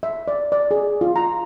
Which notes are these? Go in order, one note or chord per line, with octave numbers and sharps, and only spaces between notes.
E5
D5
D5
G#4
F4
A#5